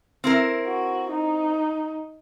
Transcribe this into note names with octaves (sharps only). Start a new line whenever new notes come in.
C4 E4 A#4
F#4
D#4